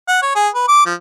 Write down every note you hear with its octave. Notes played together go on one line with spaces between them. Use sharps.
F#5
C#5
G#4
B4
D6
F3